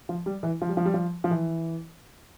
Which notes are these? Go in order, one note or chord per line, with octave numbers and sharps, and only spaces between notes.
F3
G3
E3
F3
G3
F3
G3
F3
F3
E3